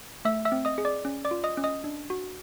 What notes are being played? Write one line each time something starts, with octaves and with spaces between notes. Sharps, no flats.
A3 E5 E6
E5 E6
C4
D#5 D#6
G#4
D5 D6
C#4
D5 D6
F4
D#5 D#6
C#4
D#5 D#6
D4
F#4